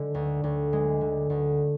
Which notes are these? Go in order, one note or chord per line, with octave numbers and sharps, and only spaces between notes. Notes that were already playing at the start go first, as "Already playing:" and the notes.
Already playing: D3 G#3
D2
D2
G#3
D3
D2